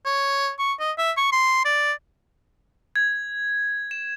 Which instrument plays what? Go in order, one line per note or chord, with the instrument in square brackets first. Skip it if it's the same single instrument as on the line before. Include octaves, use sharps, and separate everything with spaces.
[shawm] C#5
C#6
D#5
E5
C#6
C6
D5
[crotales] G#6
E7